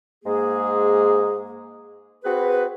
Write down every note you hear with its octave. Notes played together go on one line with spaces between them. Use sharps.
G#2 G#3 A#3 G#4
C4 F#4 G#4 B4